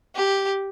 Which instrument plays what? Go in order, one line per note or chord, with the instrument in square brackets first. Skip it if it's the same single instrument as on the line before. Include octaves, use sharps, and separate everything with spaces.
[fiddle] G4